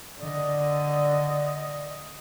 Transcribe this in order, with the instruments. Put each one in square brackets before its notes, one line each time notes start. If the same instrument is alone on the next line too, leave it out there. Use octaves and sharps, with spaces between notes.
[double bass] D3 [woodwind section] D5 D#5